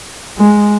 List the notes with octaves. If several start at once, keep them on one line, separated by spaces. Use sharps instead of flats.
G#3